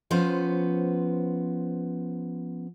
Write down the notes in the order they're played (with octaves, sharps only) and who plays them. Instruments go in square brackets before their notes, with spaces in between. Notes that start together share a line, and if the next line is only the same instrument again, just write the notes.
[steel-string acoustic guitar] F3 B3 C#4 C5